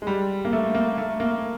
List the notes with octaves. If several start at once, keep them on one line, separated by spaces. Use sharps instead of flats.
G#3
G3
A#3
A3
A#3
A3
A#3